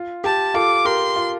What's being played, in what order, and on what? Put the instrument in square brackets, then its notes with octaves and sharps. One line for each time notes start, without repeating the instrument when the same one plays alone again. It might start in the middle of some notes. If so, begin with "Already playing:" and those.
Already playing: [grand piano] F4
[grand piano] G4 [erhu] A5
[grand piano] F4 A4 [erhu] D6
[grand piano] G4 A#4 [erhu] C6
[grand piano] F4